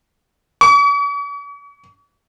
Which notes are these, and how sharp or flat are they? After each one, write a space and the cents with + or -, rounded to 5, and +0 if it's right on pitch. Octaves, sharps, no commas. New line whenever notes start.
C#6 +40